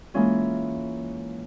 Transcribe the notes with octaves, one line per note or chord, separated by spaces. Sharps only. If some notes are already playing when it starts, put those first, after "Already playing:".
E3 G#3 A#3 C#4 F4